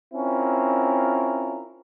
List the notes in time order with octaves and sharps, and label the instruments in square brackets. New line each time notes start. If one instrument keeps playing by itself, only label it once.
[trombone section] C4 C#4 E4 F4 A#4